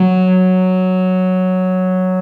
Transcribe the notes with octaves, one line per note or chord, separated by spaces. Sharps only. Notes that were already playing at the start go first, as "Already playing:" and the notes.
Already playing: F#3